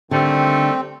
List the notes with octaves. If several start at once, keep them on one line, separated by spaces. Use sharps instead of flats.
D3 D#3 G3 A3 C4